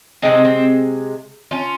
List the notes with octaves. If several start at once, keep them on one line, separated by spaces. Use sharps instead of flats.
C3 D#3 G#3 C4 D#4
C4
C#4 F4